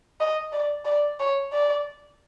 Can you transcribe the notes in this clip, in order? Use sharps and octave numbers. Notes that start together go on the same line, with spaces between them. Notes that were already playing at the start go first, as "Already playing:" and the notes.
D#5
D5
D5
C#5
D5